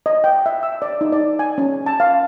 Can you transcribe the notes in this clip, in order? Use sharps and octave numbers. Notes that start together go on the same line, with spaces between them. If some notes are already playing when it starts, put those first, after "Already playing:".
D#5
G5
E5
E6
D5
D#4
D5
G#5
C#4
A5
F5